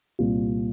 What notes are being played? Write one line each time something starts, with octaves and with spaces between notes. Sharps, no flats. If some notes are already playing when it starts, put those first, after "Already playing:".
C2 A#2 G3 C4 F4